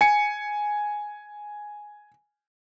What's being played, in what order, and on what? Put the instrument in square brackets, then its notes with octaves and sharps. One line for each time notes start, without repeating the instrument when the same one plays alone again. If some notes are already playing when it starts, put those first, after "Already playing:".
[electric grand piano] G#5 C#7